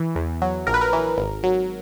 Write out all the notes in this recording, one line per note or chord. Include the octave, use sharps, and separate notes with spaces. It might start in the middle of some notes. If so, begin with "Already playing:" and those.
Already playing: E3
E2
F#3
A#1 A#4
B4
A#4
E3
G#1
F#3